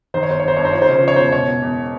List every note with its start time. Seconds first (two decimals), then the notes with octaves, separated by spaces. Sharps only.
0.14 D#3 C5
0.23 C#5
0.29 G1 C5
0.40 C#5
0.44 G1 C5
0.57 G2 C#5
0.65 C5
0.73 F3 C#5
0.82 C5
0.88 C#3 C#5
0.98 C5
1.03 F3 C#5
1.16 E1 C5
1.32 B2 C#5
1.47 B2
1.62 E2